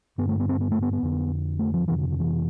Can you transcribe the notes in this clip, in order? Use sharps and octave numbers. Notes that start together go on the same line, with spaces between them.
G2 D3 B3
A3
B3
C4
B3
A3
B3
B3
F2 D3
A3
F3
F2 C3 E3
D3
D3
E3